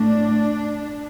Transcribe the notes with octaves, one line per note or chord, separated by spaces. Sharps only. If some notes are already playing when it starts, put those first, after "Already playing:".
Already playing: A2 A3 D4